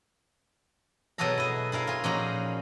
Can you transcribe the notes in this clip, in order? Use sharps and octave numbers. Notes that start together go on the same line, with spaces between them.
B2 F#3 F#4 G#4 A4 A#5
E4 D#5
E4 G#4 A#4 F5
F4 G#4
A#2 F3 C#4 D#4 F#4 A#5